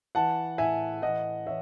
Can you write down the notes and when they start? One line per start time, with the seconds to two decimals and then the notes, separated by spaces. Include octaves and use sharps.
0.15 E3 F#5 A5
0.58 A2 E5 G#5
1.02 E3 D#5 F#5
1.46 E3 C#5 E5